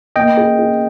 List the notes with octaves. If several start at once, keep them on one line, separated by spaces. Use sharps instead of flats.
A#3 D#5 G5
G#4
G#4